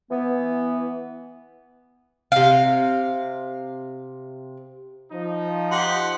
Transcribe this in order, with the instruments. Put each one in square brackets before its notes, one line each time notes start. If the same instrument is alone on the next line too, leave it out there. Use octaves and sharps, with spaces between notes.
[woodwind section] E3 B3
[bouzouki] C3 F5
[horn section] F3 D#4
[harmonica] G4 F#5 C6